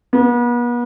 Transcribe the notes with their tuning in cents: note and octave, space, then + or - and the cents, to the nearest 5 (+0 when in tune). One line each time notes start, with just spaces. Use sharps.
B3 -40